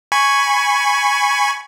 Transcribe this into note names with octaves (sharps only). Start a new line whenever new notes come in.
G#5 B5 C#6